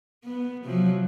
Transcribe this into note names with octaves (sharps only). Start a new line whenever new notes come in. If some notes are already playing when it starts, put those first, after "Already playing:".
B3
C3 F3 F#3